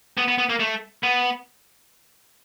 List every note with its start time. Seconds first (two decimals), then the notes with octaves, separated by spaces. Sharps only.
0.18 B3
0.28 B3
0.38 B3
0.49 A#3
0.60 A3
1.03 B3